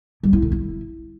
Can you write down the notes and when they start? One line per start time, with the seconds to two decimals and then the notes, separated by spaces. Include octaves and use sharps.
0.23 G3
0.33 E4
0.42 D3
0.52 E4